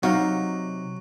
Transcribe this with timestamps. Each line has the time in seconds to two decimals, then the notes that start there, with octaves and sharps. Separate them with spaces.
0.03 C3 F#3 D#4 F#4 F5